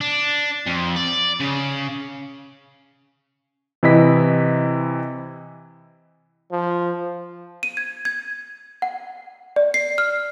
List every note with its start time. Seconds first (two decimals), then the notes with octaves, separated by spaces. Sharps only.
0.01 D4
0.67 F2
0.96 D5
1.40 C#3
3.83 C3 E3 E4 D#5 B6
6.52 F3
7.63 D#7
7.77 G#6
8.05 G#6
8.82 F#5
9.56 D5
9.74 C7
9.98 F6